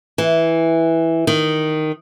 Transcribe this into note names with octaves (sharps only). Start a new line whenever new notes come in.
E3
D#3